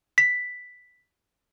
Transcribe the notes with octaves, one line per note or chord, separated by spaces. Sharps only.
B6